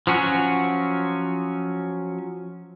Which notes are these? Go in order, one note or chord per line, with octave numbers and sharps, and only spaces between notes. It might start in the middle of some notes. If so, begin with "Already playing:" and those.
F3 F#3 C#4 F#4